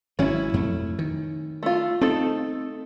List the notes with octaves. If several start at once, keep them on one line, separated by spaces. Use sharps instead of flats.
G#1 F#3 C#4 E4
F2 A3
D#3
A3 F4
A3 C4 D#4 A4